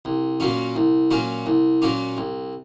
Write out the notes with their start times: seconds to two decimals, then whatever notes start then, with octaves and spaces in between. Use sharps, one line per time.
0.05 C2
0.40 A#2 F#3 A#3 C#4
0.75 C2
1.11 A#2 F#3 A#3 C#4
1.46 C2
1.82 A#2 F#3 A#3 C#4
2.17 C2